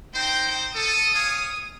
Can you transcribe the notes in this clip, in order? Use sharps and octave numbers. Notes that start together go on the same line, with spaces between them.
C4 D#4 C5 G5 G6
A4 D#6 D#7
C#5 F5 G#5